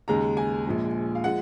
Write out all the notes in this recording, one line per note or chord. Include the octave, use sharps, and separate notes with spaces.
D#2 C#3 G#3 A#5
G#5
A#1 A#2 F3 G#3
F5
F3 G#3 F#5